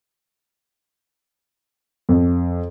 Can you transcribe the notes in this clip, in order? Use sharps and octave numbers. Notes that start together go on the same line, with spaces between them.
F2